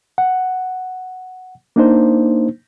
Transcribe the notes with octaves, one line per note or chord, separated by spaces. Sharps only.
F#5
A#3 D4 D#4 C5